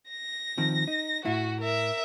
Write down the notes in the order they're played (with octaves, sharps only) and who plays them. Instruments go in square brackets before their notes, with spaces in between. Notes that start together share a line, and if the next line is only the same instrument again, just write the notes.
[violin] A#6
[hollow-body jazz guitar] D#3 F3 C4
D#4
[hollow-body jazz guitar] A2 E4 [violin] F#4
[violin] A#4 E5